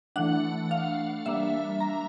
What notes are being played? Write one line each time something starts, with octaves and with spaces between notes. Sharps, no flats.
E3 A3 D4 F#5
F5
G3 A#3 D4 E5
A#5